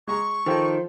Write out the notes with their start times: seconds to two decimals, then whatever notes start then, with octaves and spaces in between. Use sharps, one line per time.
0.08 G#3 A#5 C#6
0.46 D#3 F3 A4 G5